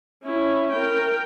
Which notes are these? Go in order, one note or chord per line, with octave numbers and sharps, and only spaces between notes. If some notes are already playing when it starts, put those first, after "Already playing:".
C#4 E4
A#4 G5